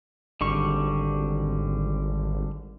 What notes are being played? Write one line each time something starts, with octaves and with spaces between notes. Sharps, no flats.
G#1 D3 G3 C#6